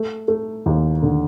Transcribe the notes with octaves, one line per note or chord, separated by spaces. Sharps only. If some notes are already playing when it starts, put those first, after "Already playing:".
Already playing: A3
A3
D#2
D3